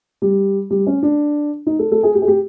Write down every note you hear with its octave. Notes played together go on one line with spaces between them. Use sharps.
G3
G3
C#4
D4
D#4
A4
A4
G#4
G4
G#4
G4